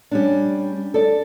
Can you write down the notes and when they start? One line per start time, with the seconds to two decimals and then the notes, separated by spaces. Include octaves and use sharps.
0.11 G3 C#4 D4
0.94 A4 D5